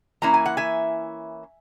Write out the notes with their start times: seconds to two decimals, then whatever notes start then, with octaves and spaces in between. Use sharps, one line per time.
0.22 E3 A#3 C#4 E4 A#5
0.34 G#5
0.46 F#5
0.57 E5 G#5